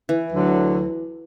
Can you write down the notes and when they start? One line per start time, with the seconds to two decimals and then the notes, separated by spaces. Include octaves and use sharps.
0.09 E3
0.31 D2 D3 F#3